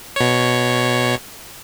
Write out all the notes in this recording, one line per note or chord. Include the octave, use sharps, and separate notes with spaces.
B2 C#5